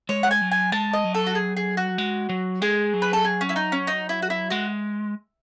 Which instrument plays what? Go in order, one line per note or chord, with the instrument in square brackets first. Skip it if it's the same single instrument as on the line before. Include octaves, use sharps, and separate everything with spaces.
[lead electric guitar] G#3 [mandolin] C#5
[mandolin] F#5
G#5
[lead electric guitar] F#3
[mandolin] G#5
[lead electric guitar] G#3 [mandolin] A5
[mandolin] D#5
[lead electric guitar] F#3
[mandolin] A4
F#4
G#4
G#4
F#4
[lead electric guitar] G#3
F#3
[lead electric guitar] G#3 [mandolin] G#4
[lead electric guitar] F#3
[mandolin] B4
A4
G#4
C#4
E4
D#4
C#4
D#4
E4
F#4
E4
[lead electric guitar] G#3 [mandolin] F#4